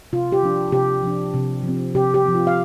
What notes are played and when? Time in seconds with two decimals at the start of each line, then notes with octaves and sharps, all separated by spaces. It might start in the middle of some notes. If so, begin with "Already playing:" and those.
0.13 C3 F4
0.32 G4
0.43 F3 D4
0.72 C3 G4
1.03 F3 D4
1.34 C3
1.64 F3 C4
1.95 C3 G4
2.14 G4
2.25 F3 C4
2.35 F4
2.47 F5